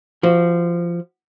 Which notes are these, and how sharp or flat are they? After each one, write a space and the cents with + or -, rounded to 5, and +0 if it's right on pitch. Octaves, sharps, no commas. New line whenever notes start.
F3 -20 F#4 +0